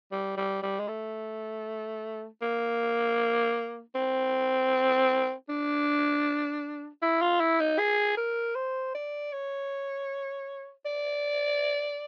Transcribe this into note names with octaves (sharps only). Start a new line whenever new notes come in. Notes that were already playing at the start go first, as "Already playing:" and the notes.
G3
G3
G3
G#3
A3
A#3
C4
D4
E4
F4
E4
D#4
G#4
A#4
C5
D5
C#5
D5